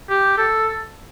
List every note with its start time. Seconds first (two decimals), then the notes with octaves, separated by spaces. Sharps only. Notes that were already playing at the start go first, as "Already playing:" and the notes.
0.09 G4
0.38 A4